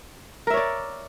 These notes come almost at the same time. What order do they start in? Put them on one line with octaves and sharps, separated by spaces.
A#4 E5 C#5 D5